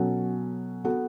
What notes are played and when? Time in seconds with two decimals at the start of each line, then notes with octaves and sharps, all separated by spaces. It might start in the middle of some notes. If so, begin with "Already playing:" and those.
Already playing: B2 F#3 C#4 F#4 A4
0.84 B3 F#4 A4